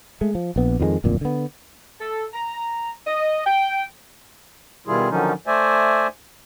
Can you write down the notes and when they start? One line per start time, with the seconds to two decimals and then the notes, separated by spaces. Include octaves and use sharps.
0.21 G#3 A3
0.35 F3
0.56 A#1 B3
0.80 F2 D#3 F#3 G#3
1.04 D1 F2 A#2
1.21 D3 B3
2.01 A4
2.34 A#5
3.07 D#5
3.46 G5
4.87 B2 D#3 G3 E4 F4 G#4
5.10 D3 D#3 F3 F#3 C#4 D#4
5.47 A3 C5 D5 E5 G#5